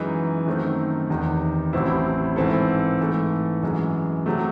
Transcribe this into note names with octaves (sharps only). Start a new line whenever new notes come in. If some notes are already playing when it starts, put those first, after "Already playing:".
Already playing: F#2 E3 G#3 D#4
F#2 D#3 A3 C4
E2 C3 D#3
A1 A2 F#3 C4 E4
G#2 E3 C4 E4 A4
G#2 E3 A3
F#2 E3 G#3
C3 F#3 A3